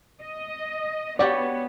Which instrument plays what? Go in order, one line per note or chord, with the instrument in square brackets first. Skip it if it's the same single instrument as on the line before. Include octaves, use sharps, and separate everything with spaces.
[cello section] D#5
[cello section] B3 [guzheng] F#4 G4 [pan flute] C#5 [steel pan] D5